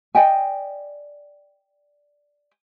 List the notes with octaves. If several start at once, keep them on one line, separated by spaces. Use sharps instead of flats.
D5 D#5 G5 G#5